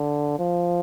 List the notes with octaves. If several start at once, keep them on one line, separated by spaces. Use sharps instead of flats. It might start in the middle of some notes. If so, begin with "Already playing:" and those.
Already playing: D3
F3